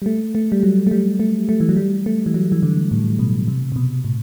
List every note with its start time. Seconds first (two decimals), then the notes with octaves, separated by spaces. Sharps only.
0.02 G3
0.06 A3
0.35 A3
0.52 G3
0.63 F#3
0.87 A3
0.91 G3
1.20 A3
1.49 A3
1.60 E3
1.69 F#3
1.76 G3
2.06 A3
2.26 E3
2.34 F#3
2.52 E3
2.63 D3
2.91 A2
3.19 B2
3.48 C3
3.72 C3
3.76 B2
4.05 A2